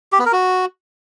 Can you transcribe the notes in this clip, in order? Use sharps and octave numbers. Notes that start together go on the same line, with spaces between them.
G4
B3
A#4
F#4